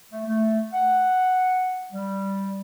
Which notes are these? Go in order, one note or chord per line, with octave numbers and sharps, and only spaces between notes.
A3
A3
F#5
G3